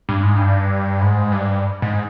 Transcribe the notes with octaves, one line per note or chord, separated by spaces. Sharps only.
G2
G#2
G2
G#2
G2
G#2